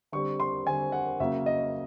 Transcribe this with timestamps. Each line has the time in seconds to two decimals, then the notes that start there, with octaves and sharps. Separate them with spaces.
0.12 D3 G3 C4 C#6
0.40 C6
0.66 D3 G3 C4 G#5
0.92 F#5
1.20 C#3 F#3 A#3 E5
1.46 D#5